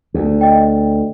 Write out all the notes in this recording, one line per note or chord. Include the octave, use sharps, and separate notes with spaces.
D2
D#5 G5